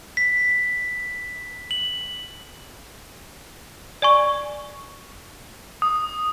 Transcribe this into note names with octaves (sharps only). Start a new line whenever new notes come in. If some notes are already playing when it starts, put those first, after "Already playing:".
B6
F#7
D5 G#5 C#6
D#6